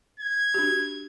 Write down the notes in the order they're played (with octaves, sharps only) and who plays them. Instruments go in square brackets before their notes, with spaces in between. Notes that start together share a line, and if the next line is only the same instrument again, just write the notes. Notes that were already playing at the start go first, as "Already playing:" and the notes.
[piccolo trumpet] G#6
[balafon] D4 F#4 G4